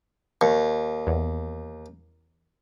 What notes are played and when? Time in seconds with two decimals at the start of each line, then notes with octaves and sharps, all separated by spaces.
0.41 D#2 C#6
1.07 E2